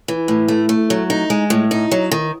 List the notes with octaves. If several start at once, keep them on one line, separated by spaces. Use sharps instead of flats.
E3
A2
A3
A3
F#3
D#4
G#3
A2
D#4
F#3
D#3